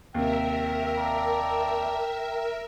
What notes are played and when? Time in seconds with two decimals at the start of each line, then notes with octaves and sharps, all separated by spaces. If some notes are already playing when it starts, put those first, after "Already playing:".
0.14 D#2 C3 A#4 E5 G5
0.98 D5 A5 A#5